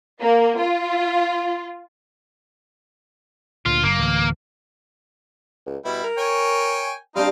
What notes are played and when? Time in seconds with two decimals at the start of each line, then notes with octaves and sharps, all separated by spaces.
0.23 A#3
0.59 F4
3.66 D2 A#2 F4
3.83 F#1 A#3
3.99 D2 A2 E3
5.66 C#2
5.85 B2 G3 E4
6.04 A#4
6.18 C#5 G5 G#5
7.16 C3 G3 C4 D4 D#4 F5